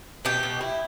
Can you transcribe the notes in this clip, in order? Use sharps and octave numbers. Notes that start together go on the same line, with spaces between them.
B2 G4
B2
E4